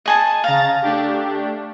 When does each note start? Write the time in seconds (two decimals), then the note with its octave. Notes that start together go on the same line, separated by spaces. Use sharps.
0.06 D#5 G#5 A5
0.44 C#3 F5 A#5 A6
0.82 A3 D4 G4